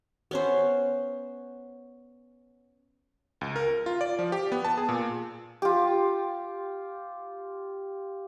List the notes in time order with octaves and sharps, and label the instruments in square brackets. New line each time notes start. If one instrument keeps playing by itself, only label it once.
[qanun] B3 C#4 C5
[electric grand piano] C#2
A#4
F4
D5
F3
G4
B3
A5
G#4
A#2
[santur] F4 G4